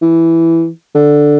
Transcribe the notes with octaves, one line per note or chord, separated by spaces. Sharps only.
E3
D3